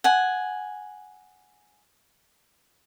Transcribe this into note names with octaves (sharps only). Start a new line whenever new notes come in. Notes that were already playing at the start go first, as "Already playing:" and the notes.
F#5 G#5